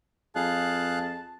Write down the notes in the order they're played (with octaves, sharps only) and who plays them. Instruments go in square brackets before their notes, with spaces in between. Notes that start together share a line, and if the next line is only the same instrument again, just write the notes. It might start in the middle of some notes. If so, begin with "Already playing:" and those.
[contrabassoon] F2 [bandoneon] G#4 F5 F#6 [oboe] A5